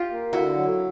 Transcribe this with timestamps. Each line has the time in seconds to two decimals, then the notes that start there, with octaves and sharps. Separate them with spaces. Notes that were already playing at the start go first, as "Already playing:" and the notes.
Already playing: F4 G4
0.10 A#3
0.33 D3 E4 F#4
0.56 F#3